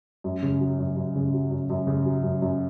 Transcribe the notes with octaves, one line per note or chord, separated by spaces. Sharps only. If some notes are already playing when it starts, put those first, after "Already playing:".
F#2
C#3
F#3
F#2
F#2
C#3
F#3
F#2
F#2
C#3
F#3
F#2
F#2